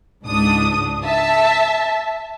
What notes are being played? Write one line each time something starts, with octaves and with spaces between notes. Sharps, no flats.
C#2 G#2 D4 D#6
E5 A5